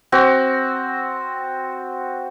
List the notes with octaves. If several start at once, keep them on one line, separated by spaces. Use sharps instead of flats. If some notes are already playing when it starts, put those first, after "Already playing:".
C4 F#4